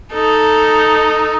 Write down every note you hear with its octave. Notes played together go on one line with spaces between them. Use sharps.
D#4 A4